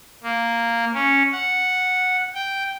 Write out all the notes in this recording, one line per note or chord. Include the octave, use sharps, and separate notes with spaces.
A#3
C#4
F#5
G5